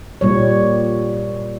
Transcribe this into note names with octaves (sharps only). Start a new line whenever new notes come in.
A#2 G3 C#5